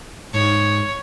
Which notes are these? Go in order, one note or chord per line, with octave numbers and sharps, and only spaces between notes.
G#2 C#5